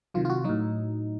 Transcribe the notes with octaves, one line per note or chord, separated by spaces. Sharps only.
C3 D#3 F#3 F4
F4
F#4
A2 F#3 D#4